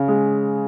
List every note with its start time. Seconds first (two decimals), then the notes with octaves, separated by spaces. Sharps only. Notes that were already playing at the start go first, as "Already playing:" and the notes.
Already playing: C#3
0.08 G#3